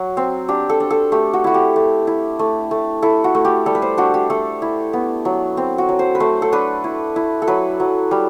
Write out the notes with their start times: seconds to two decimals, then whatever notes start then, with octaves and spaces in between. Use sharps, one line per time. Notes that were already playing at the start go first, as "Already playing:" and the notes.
Already playing: F#3 F#4
0.17 C4
0.48 D4 G4
0.69 A4
0.80 D4
0.91 A4
1.12 A3 G4
1.33 F#4
1.44 E4 F#4
1.54 G4
1.76 A3
2.07 E4
2.39 A3
2.71 A3
3.02 E4 A4
3.24 F#4
3.35 A3
3.45 G4
3.66 G3 A4
3.75 B4
3.82 C5
3.98 D4 F#4
4.14 G4
4.30 A3 A4
4.62 E4
4.93 B3
5.25 F#3
5.57 C4
5.78 F#4
5.89 F#3
5.99 C5
6.15 B4
6.20 A3 C5
6.42 A4
6.52 D4 B4
6.84 E4
7.16 E4
7.42 A4
7.47 F#3 B4
7.80 F#3
8.11 G3